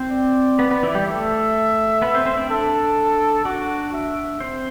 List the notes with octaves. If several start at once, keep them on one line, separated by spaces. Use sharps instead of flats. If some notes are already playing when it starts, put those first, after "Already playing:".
Already playing: C4 C5
D5
B3 B4
B3 B4
E3 E4
G3 G4
A3 A4 E5
B3 B4
C4 C5
C4 C5
D4 D5
A4
D4 F#4 D5
E5
C4 C5